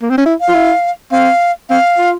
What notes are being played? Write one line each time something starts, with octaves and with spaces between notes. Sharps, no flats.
A#3
C4
C#4
E4
F5
F4
E4
C4 F5
C4 F5
F4